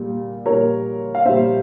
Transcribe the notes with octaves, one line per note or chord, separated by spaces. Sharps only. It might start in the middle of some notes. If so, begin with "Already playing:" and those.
Already playing: A#2 G3
A#2 G3 A#4 C#5
F5
A#2 G3 C5 E5